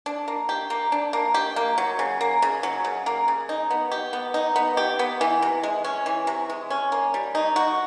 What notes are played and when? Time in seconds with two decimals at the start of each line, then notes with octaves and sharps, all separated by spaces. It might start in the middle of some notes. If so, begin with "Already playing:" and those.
0.06 D4
0.28 A#3
0.49 G4
0.70 A#3
0.92 D4
1.13 A#3
1.34 G4
1.56 A#3
1.78 F#3
1.99 C#3
2.21 A#3
2.42 C#3
2.63 F#3
2.84 C#3
3.06 A#3
3.28 C#3
3.49 D#4
3.70 B3
3.92 G4
4.13 B3
4.34 D#4
4.56 B3
4.77 G4
4.99 B3
5.21 E3
5.42 C3
5.63 G#3
5.84 C#4
6.06 E3
6.27 C3
6.50 G#3
6.70 C#4
6.92 A#3
7.14 G3
7.35 D#4
7.56 F#4